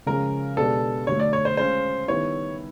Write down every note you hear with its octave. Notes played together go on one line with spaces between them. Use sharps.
C#3 F3 G#3 C#4 A#4
B2 G#3 B3 D4 G4 A4
D3 F#3 A3 C#5
D5
C#5
C5
G#3 C#4 F4 C5
D#3 G3 B3 E4 C#5